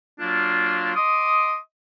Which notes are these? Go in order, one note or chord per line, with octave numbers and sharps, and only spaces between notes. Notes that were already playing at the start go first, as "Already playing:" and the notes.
F#3 A#3 D4 F4
D#5 C6 D6 D#6